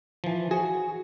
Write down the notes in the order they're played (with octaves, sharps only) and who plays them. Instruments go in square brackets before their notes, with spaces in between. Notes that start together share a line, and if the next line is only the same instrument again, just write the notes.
[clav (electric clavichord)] E3 F3
[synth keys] F#4 [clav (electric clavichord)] G#4